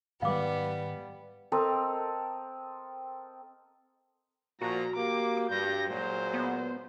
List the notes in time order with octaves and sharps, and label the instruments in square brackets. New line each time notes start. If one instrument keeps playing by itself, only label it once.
[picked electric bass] G#2 D#3 [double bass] G3 [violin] B3 [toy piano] F5 D6
[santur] C4 A4 A#4 D#5
[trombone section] A#2 F3 [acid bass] F#4 [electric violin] A#5
[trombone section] A#3 G4 [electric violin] D6
[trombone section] G2 G3 [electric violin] G6 A#6
[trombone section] A#2 F#3 G#3 [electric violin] C5
[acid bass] B3